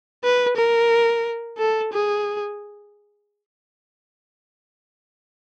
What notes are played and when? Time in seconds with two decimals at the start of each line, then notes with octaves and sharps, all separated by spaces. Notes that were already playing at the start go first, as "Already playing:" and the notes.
0.24 B4
0.57 A#4
1.58 A4
1.92 G#4